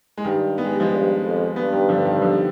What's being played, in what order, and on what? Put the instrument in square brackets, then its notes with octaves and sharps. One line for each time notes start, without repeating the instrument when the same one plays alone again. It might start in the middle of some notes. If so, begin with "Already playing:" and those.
[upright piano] G#3
[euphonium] G2 [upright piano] D#3 G3
[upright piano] B3
G#3
G3
F3 G#3
[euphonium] G2
F2
[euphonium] G2 [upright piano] G3 B3
[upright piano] D#3 G3
D3 F3
D#3 G3
D3 F3